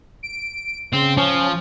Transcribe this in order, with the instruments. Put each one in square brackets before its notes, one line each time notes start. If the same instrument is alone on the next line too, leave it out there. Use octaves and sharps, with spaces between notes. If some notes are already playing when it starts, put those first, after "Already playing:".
[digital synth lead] D7
[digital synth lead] C#3 [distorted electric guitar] C4
[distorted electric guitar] F3 [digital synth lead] C#4